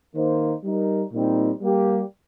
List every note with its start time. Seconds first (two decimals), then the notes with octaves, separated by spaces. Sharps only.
0.14 D#3 A#3 D#4 C5
0.63 G3 D#4 A#4
1.12 A#2 G3 C4 D#4
1.61 G3 A#3 G4